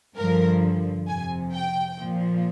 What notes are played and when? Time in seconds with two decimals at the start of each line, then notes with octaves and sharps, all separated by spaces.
0.17 G2 D3 F3 A#4
1.08 F2 C3 F3 G#5
1.53 G5
1.99 A#2 F3